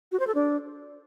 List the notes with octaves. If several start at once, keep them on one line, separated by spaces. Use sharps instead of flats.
F#4
C5
A4
D4